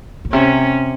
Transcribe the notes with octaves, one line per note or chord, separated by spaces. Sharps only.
A#2
C3 C#4